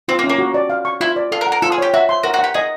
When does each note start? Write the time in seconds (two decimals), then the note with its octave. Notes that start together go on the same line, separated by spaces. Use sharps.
0.08 C4 F4
0.19 A#3
0.24 C#4
0.29 A#3
0.39 F#4
0.54 D5
0.70 F5
0.85 C#6
1.01 E4 F4
1.16 D5
1.32 F4 A4
1.41 A#4
1.47 F#5
1.52 A#4
1.62 F4 A4
1.72 G#4
1.78 G4 C#5
1.94 F#4 E5
2.09 C6
2.23 F#4 A#4
2.34 F#4
2.39 G4 F#5
2.54 G#4 D#5